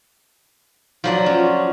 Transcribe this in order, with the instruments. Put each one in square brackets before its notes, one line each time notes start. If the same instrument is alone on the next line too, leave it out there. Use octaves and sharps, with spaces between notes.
[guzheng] F3 F#3 D5
[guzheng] C#4 [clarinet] F4